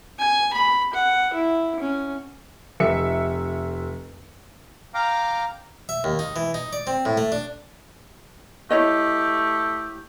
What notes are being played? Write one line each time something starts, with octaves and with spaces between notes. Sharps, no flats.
G#5
B5
F#5
E4
C#4
F1 E5 C#7
F5 G5 A#5 D6 F6
E5
D#2
D#4
E3
D#4
D5
C4
A2
A3
D4
A3 E4 G4 C#5 D#5